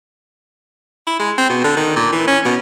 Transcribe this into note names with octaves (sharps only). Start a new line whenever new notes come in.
E4
G#3
C4
B2
D3
D#3
A#2
E3
C#4
B2